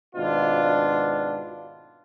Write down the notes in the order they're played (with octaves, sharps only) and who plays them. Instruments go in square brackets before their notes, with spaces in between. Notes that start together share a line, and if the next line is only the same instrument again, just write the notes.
[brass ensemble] G#1 B2 D4 F4